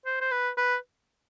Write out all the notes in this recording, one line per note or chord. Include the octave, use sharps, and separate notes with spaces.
C5
C5
B4
B4